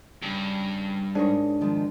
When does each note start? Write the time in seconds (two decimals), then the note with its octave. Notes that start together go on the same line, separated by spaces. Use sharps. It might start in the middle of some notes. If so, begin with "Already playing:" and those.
0.22 G2 C#3
1.15 G#2 D4 G#4 A#4 C#5
1.60 D#3 F3 G#3